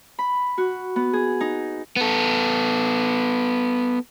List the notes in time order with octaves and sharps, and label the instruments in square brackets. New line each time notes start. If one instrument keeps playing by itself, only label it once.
[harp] B5
F#4
B3
G#4
D#4
[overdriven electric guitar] B3 A4